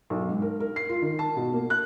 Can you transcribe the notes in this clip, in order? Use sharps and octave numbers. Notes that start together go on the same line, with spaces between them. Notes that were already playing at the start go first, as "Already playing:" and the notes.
B1
G#2
A#4
A#4
C7
F4
D#3
A5
B2
A#3
F#6